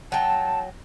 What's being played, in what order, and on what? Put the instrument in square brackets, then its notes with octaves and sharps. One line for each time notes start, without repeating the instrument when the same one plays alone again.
[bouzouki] F#3 G5 [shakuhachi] A5